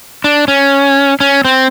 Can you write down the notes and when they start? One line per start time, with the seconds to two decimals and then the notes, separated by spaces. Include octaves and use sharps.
0.24 D4
0.48 C#4
1.20 C#4
1.45 C4